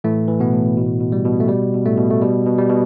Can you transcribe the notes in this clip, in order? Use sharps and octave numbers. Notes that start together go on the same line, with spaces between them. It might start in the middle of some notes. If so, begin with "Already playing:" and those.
A2 E3 A3
E3
B2 B3
A2
B2
B2
G3
B2
A3
B2 G3
B2
A2 A3
B2
A3
B2 G3
B2
G3
B2